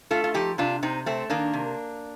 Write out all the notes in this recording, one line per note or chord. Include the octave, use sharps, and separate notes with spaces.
A3 F4 A4
F4
F3 D#4 G4
C3 D4 F4
C3 C4 D#4
A3 C4
D#3 A#3 D4
C3